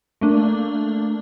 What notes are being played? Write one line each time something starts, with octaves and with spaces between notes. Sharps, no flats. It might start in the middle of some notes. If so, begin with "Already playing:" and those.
A3 A#3 D4